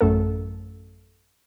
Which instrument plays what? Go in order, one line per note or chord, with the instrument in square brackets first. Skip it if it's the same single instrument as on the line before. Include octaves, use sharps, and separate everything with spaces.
[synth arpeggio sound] A1 F#2 A3 A4